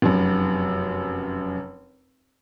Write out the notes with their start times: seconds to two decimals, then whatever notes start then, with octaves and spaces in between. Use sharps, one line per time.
0.02 F1 F#2